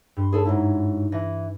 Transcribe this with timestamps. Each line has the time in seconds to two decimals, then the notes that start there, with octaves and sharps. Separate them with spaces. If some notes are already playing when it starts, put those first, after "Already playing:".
0.16 G2 C6
0.33 G#4 A4 C#5
0.45 G#2 F#3 E4
1.12 E3 A#6